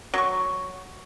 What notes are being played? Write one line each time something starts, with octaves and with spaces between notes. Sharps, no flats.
F#3 C#6